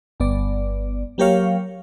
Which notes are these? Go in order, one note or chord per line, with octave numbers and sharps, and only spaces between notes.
G1 B3 D5
F#3 A#3 G4 A#4 C#5 F5